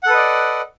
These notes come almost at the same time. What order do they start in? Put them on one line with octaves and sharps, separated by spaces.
F#5 A4 B4 D#5 D5